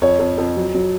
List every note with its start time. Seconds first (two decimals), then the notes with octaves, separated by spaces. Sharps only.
0.02 F2 C#5
0.19 F2
0.38 F2
0.57 F#3
0.75 F#3